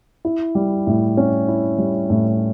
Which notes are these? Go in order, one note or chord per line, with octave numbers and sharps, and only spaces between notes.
E4
G3
A2
C#4
E4
G3
A2